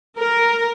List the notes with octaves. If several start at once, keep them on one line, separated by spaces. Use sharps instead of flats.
A#4